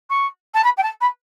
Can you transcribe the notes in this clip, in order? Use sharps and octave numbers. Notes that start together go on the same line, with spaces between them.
C#6
A5
B5
G5
A5
B5